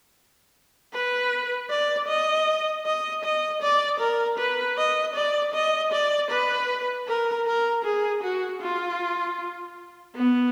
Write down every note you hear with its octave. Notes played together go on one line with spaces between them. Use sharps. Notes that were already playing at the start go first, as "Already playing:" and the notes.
B4
D5
D#5
D#5
D#5
D5
A#4
B4
D#5
D5
D#5
D5
B4
A#4
A#4
G#4
F#4
F4
B3